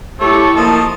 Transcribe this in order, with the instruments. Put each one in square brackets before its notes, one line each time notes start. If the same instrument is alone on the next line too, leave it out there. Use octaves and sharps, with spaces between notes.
[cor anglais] A3 [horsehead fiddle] E4 A4 [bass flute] G4 [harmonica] C#5
[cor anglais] F3 [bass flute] A#3 [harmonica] D#5 A5